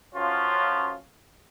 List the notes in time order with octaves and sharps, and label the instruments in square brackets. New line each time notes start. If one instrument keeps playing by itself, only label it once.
[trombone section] F#2 F3 C#4 F4